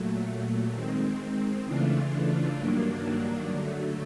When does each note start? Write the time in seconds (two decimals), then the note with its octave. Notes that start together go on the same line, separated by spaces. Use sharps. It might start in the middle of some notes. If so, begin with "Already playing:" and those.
Already playing: A#2 F#3 A3
0.72 D#3 G#3 C4
1.64 C#3 E3 A3 D4 F4
2.56 G2 D#3 F#3 A#3 D4
3.48 D3 F#3 A3